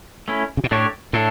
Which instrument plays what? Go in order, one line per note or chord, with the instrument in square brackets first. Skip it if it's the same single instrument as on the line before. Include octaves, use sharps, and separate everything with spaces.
[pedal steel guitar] A3 C#4 E4
[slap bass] C#3
B2
[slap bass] A2 [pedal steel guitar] A3 D4 G4 C#5
[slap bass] A2 [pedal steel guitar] A3 D4 A4